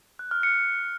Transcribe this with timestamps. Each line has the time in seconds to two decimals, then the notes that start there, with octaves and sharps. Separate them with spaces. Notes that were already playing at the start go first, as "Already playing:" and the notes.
0.19 F#6
0.31 F6
0.43 C#7